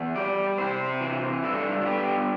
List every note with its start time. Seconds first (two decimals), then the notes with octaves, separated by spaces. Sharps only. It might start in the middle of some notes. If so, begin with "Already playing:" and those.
Already playing: E2
0.16 G3 D5
0.58 C3 C5
1.01 E3
1.43 G2 A4
1.82 F4
1.86 B3 G4